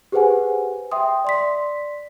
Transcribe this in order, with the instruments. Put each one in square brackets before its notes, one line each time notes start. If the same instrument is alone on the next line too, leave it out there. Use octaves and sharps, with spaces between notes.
[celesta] G4 G#4 B4 C5 F#5 G#5
E5 G5 C6 D#6
D5 C6 B6